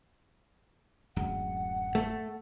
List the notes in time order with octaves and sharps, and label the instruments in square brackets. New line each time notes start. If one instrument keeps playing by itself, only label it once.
[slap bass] D1 F#2 G#3 [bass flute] F#5
[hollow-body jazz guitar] A3